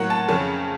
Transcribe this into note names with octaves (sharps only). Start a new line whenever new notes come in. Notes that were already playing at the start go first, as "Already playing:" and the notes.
Already playing: A2 F#3 A#3 F#5
A5
F2 C#3 A3 C#4